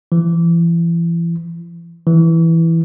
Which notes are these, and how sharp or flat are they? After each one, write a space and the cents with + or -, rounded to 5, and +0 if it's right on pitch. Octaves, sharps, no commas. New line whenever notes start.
E3 +35
E3 +0